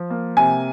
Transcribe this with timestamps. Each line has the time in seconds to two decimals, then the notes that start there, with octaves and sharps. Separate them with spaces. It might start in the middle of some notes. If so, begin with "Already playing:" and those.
Already playing: F3
0.10 A#3
0.37 C3 G#5